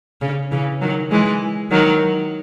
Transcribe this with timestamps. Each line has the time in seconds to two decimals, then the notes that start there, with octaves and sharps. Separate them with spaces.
0.21 C#3
0.51 C#3 E3
0.81 D#3 F#3
1.11 E3 G#3
1.71 D#3 F#3